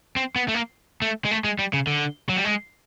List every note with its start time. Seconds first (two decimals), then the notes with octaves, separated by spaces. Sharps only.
0.16 C4
0.36 B3
0.48 A3
0.54 A#3
1.02 A3
1.25 G#3
1.31 A3
1.44 G#3
1.59 G3
1.73 C#3
1.87 D3
2.29 F#3
2.36 G3
2.44 G#3